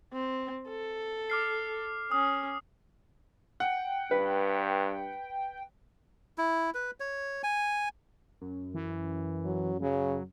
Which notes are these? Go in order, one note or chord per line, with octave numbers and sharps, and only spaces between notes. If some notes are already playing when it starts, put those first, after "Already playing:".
C4
A4
D6 F6 C7
C#4 D#6
F#5 G5
G2 B4
E4
B4
C#5
G#5
F#2
E3
F#3
C#3 F#3